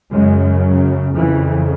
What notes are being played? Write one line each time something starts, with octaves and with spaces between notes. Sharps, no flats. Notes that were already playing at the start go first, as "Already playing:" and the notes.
F#2 C#3 G#3
F#3
F2 C#3 E3